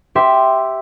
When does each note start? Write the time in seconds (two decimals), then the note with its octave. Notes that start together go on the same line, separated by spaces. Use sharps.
0.15 G4 E5 C6